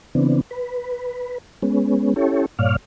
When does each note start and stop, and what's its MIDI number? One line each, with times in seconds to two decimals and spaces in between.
0.15 0.41 49
0.15 0.41 52
0.15 0.41 59
0.15 0.41 60
0.15 0.41 62
0.51 1.38 71
1.62 2.14 56
1.62 2.14 59
1.62 2.14 61
2.16 2.46 61
2.16 2.46 64
2.16 2.46 67
2.16 2.46 69
2.16 2.46 73
2.59 2.76 43
2.59 2.76 46
2.59 2.76 73
2.59 2.76 74
2.59 2.76 77
2.59 2.76 89